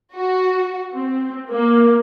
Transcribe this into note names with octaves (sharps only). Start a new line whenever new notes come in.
F#4
C4
A#3